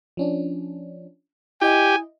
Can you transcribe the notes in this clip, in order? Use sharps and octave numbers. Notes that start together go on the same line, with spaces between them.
F3 C#4 D4
E4 G4 D#5 G#5